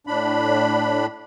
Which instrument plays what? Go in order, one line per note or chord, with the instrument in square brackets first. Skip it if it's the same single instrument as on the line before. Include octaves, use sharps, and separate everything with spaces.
[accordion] A2 D4 B5